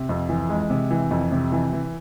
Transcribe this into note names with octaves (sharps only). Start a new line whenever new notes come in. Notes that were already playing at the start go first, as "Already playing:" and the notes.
Already playing: C3
F2
E3
G#3
C3
E3
F2
C3
E3
E3